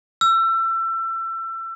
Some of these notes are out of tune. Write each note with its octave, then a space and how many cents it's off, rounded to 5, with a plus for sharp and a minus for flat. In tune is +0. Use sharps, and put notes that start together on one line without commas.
E6 +30